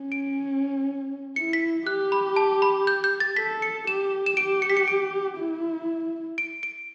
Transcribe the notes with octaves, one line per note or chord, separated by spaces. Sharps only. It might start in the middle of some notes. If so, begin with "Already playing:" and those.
Already playing: C#4
D7
E4 C#7
B6
G4 F#6
B5
A5
B5
G6
G6
A6
A4 B6
C#7
G4 E7
E7
G4 D7
C#7
B6
C#7
D7
E4
D7
D7